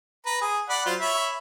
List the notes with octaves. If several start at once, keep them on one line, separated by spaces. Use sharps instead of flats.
B4 A#5
G#4 D#6
D5 F#5 B5
F#3 F4 C5
C#5 E5 B5